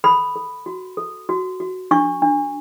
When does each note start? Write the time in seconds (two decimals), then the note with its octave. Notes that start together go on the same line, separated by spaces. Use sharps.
0.04 A4 B5
0.36 A4
0.66 F#4
0.97 A4
1.29 F#4
1.60 F#4
1.91 D4 C#6
2.22 D4